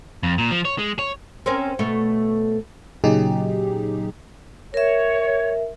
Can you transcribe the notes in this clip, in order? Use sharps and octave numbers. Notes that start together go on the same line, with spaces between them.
F2
A#2
F3
C#5
G#3
C#5
C4 C#4 A#4
B2 A3 C#5
A#2 C#3 F#3 D#4 G4 G#4
A#4 C#5 E5